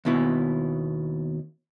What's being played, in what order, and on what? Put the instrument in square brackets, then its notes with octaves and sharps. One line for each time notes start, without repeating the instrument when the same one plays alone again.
[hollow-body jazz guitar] D#2 B2 E4